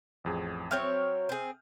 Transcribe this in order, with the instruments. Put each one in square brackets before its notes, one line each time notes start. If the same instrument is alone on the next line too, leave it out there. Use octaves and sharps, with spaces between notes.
[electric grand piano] A1 F2 G#4
[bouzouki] F#3 C4 C#5 [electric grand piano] E5 F6 G6
[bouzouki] C4 G#4